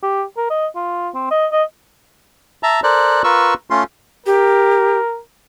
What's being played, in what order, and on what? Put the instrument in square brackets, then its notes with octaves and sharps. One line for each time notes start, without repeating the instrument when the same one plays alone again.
[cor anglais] G4
A#4
D#5
F4
C4
D#5
D#5
[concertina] E5 A5 A#5
A4 A#4 C5 D5 F#6
F4 A#4 B4 C#6 E6
A3 C#4 F4 C6
[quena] G4 [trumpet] A#4